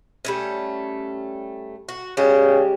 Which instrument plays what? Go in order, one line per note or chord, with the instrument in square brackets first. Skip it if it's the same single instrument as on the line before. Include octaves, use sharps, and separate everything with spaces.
[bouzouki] G3 A3 C#4
F#4
[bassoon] C#3 [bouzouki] G3 G#3 G4